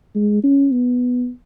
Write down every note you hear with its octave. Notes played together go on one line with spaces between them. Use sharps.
G#3
C#4
B3